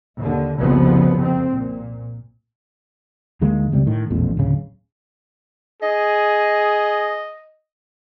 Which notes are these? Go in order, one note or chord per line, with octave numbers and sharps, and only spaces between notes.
D#2 D3
F#1 C2 F2 C#3 F3 B3
F2 C4
A#2
D2 D#3 G#3 A#3
C#2 C3 G3
A2 D#3
E1 A#1 F2
D1 C#3
G#4 D#5